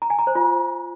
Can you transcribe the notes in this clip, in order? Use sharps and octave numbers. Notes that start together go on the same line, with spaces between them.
A#5
G#5
A#5
C5
F4